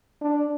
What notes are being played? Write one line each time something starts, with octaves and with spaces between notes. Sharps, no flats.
D4